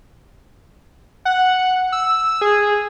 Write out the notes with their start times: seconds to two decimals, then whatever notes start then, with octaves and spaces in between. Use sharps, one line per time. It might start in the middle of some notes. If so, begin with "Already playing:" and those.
1.25 F#5
1.92 E6
2.41 G#4